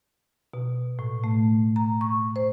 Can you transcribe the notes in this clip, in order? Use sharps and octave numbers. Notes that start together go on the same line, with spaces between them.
B2
A2
A3
A#5
C#6
C5